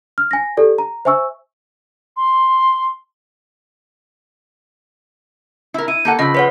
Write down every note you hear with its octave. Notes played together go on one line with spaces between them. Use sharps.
F6
G#5 A#6
G4 A4 D5
A#5
C5 E5 G#5 C#6 E6
C6
E4 A#4
E4 D#7
A#3 A4 F#5 G6
C#3 F3 D#5 B5 E6
B4 C#5 F#5 B6